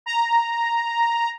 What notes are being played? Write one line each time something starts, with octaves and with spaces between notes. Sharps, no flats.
A#5